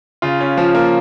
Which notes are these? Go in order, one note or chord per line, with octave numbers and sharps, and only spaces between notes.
C#3 F4
C#4
F3
A#3